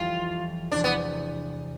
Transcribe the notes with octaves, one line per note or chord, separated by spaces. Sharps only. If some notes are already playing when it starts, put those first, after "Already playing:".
Already playing: F2 E3 G3 F4
E1 E2 C3 D4
B3